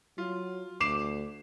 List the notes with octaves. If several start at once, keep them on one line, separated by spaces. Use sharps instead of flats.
F#3 F4
D2 D6 C7 E7